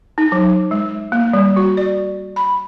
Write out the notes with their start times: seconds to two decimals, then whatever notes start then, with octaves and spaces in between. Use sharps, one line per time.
0.18 D#4
0.32 F#3
0.71 G#3
1.12 A#3
1.33 G3
1.57 F#4
1.77 D5
2.36 B5